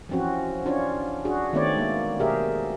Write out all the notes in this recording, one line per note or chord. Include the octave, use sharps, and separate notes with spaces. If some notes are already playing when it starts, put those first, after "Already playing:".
E3 F3 C4 C#4 F#4
C#4 D4 F4 C#5
D4 F#4 G#4
D#3 A3 B3 C4 C#5 D5
G#3 A#3
B2 G4 G#4 A#4 E5